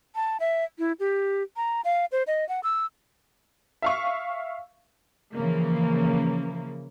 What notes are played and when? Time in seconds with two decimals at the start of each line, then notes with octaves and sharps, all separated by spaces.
0.15 A5
0.40 E5
0.79 E4
1.00 G4
1.56 A#5
1.85 F5
2.12 C5
2.27 D#5
2.49 F#5
2.63 E6
3.82 E5 F5 C#6
5.35 C#3 E3 F3 A#3